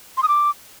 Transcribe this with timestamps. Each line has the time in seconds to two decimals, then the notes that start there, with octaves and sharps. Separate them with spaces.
0.17 C6
0.23 D#6
0.28 D6